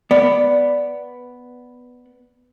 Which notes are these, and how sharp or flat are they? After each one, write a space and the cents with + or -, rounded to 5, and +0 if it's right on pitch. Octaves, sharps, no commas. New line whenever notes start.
B3 +5 D5 +0